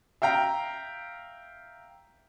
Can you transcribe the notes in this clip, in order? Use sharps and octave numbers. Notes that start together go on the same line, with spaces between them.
E5 F5 G5 A#5